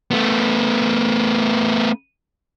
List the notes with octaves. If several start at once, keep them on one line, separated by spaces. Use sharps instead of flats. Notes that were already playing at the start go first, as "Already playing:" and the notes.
A3 B3